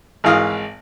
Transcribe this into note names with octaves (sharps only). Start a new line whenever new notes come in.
G#1 E3 F5 D#6